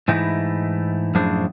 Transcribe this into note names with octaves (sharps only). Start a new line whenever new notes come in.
G#2 E3 A3 D#4 E4
F#2 A2 F3 D4 G#4 C5